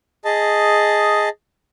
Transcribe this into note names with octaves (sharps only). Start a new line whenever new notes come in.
G#4 D#5 A5